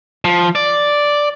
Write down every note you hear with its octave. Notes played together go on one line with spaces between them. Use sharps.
F3
D5